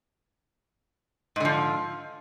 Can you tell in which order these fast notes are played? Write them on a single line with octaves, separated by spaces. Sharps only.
G#2 D3 F3